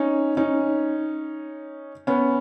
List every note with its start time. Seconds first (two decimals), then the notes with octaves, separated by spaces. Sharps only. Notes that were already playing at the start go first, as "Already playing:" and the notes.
Already playing: C#4 D#4
0.37 C#4 D#4
2.07 B3 C#4